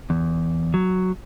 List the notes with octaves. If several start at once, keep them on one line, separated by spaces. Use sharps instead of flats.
E2
F#3